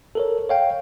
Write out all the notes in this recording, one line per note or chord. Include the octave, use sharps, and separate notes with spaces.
A4 A#4 C#5
C#5 F5 G5